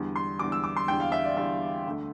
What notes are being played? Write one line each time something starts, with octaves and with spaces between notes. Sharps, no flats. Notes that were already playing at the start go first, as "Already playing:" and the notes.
Already playing: E2 D3 G3
C6
E2 D3 G3 D6
E6
D6
C6
E2 D3 G3 G5
F5
E5
D5
E2 D3 G3 E5
D2 D3 A3